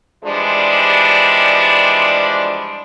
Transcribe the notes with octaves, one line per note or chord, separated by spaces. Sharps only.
E3 F3 G3 G#3 D4